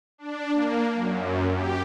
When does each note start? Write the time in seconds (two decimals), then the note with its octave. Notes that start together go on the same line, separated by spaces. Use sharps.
0.18 D4
0.53 A#3
0.94 F#2
1.53 G4